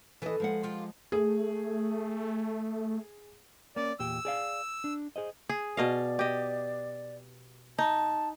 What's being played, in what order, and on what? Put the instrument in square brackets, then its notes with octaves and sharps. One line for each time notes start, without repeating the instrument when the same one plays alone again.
[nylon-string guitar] E3 D#5 [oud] A4 B4
[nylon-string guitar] F3 G#3 F#5
[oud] F4 G4
[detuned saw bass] A3 [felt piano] G#4
[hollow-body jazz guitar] A#3 C#4 [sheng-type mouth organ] D5
[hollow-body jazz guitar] E2 A#2 G4 [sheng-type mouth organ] E6
[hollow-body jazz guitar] G#4 D5 F5
D4
G#4 C5 D#5
[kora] G#4
[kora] B2 D#5 F5 [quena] D5
[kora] G4 D#5
[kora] D#4 [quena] A5